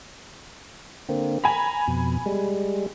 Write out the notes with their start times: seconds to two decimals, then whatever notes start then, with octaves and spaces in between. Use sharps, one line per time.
1.09 D3 A#3 C4
1.44 G#5 A#5 B5
1.87 F2 B2
2.26 G3 G#3